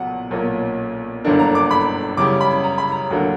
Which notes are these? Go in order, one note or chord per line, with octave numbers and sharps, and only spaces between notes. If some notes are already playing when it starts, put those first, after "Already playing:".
Already playing: B1 A#2 F#3 B3 F#5
B1 A#2 A#3 C#4
G1 F#2 D3 A#3 D4
A#5
D6
B5
F#2 C#3 G3 C#4 D6
B5
A#5
B5
A#5
D2 D3 F#3 A#3